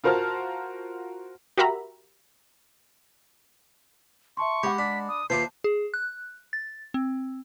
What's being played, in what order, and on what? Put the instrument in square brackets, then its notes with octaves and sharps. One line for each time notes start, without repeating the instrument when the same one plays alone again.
[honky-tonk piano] F4 F#4 A#4 C5 A5 F6
[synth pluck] F#4 G4 A#4 E5 A#5 B5
[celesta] E5 A5 C6 [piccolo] C#6
[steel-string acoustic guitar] G#3 F#5 [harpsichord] G4 [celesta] B5 D6
[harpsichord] D4 [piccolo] B6
[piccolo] D#6
[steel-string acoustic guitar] D#2 F4 B4 [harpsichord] C5 E5 D6 [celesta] A5 [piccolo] C7
[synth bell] G#4
F#6
A6
C4